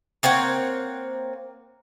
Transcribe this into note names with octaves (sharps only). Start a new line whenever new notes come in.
A#3 C4 C#5 F#5